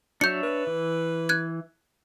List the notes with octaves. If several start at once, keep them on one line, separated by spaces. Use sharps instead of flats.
F#3 D4 C#5 E5 G6 C#7
B4
E3
F#6 G#6